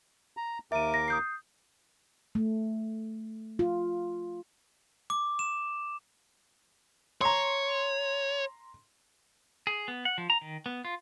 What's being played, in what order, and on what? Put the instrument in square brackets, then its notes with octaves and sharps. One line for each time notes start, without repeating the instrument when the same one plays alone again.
[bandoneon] A#5
[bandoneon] D#2 A#4 D6 [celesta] E5 D#7
[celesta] A#6
D#6 G6 C7
[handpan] A3
F4
[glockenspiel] D6
E7
[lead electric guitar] C#5 [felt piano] A#5 C6
[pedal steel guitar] G#4
B3
F#5
F3
A#5
D#3
B3
F4